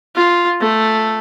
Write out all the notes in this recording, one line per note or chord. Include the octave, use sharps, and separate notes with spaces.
F4
A3